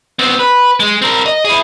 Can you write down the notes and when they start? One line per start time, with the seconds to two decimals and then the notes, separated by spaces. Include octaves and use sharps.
0.19 B3 C4
0.39 B4
0.80 G#3
1.02 C4 A#4
1.26 D#5
1.45 E4 G#4